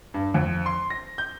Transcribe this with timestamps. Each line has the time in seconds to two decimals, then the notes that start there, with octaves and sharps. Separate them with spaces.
0.14 G2
0.34 F2
0.66 C6
0.90 A#6
1.18 G6